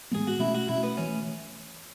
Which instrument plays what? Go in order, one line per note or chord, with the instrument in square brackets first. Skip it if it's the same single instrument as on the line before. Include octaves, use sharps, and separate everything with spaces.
[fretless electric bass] A2 E3 G#3 B3 [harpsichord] G#4
[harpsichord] F#4
[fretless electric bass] B2 A3 C#4 [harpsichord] E4
[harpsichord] F#4
[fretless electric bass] B2 A3 C#4 [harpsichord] E4
[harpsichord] B3
[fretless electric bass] E3 A3 [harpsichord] C#4